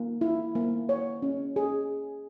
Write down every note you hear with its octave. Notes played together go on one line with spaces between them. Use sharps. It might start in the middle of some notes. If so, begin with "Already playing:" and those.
Already playing: A#3
E4
A#3
C#5
C#4
G#4